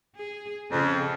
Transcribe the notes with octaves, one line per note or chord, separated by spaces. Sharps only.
G#4
F2 C#3